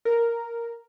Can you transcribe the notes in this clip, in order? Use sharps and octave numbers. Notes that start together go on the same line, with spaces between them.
A#4